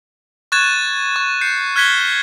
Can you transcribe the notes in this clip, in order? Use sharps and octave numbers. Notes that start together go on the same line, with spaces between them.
C#6 F#6 G#6 A6 E7
C#6
G6 C7 C#7
F6 F#6 G#6 B6 C#7 G7